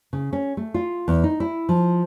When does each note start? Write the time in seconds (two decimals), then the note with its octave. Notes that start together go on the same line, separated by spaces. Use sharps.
0.13 C#3
0.33 C#4
0.57 A3
0.74 F4
1.08 E2
1.24 D#4
1.40 E4
1.69 F3